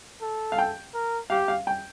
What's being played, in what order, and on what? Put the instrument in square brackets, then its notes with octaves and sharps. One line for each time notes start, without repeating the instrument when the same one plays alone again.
[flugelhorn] A4
[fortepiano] F5
G5
[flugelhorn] A#4
[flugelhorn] G4 [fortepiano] F5
[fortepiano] F5
G5